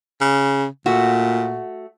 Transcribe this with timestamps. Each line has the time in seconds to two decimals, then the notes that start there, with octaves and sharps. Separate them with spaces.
0.21 C#3
0.86 A#2 A3 F#4